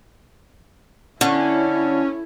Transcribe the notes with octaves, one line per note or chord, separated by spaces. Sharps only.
D3 C#4 E4